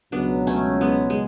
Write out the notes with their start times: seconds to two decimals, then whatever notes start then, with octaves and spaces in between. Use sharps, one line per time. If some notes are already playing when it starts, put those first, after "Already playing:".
0.12 C#2 B2 F#3 B3 D4
0.47 A3 C#4
0.81 G#3 B3
1.10 G#3